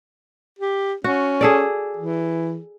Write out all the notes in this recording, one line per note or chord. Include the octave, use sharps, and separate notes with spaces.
G4
C#4 F#4
G#4 A4 D5
E3